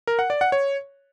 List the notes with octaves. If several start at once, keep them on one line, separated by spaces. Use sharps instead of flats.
A#4
F#5
D5
F#5
C#5